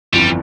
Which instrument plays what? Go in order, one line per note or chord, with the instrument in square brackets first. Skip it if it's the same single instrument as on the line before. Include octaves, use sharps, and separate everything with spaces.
[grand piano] G1 F2 E3 [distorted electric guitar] G3